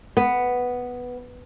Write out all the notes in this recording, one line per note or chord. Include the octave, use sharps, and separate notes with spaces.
B3